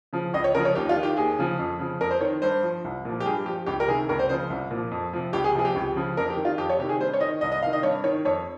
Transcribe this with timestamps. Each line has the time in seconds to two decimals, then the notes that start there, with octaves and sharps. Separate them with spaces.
0.13 C#3 F3
0.34 C#2 D#5
0.44 C#5
0.55 C#3 A#4
0.58 F3
0.65 C#5
0.75 D#2 G4
0.89 F4
0.96 D#3
1.03 G4
1.17 D#2 G#4
1.39 C#3 F3
1.59 F2
1.79 C#3 F3
2.00 F2 A#4
2.11 C5
2.21 D#3 C#5
2.42 G2 C5
2.63 F3
2.84 C2
3.05 A#2 F3
3.20 G4
3.25 G2 G#4
3.46 F3 G4
3.66 C#2 G4
3.80 A#4
3.88 C3 D#3 G#4
4.09 C#2 A#4
4.19 C5
4.29 C#3 F3 C5
4.50 C2
4.71 A#2
4.76 F3
4.91 F2
5.13 C3 F3
5.33 C#2 G4
5.44 G#4
5.55 C3 F3 G#4
5.65 G4
5.76 C#2
5.96 C#3 F3
6.17 F2 A#4
6.30 G4
6.37 D#3
6.45 F4
6.58 F2 G4
6.69 C#5
6.79 C3 G4
6.83 D#3
6.89 G#4
7.00 G2 C5
7.13 C#5
7.20 D#3 D#5
7.41 C2 D#5
7.52 D#5
7.63 C3 D#3 F5
7.73 D#5
7.83 G2 C#5
8.04 D#3 C#5
8.25 F2 C#5